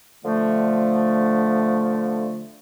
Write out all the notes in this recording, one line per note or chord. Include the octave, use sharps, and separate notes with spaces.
D3 F3 A3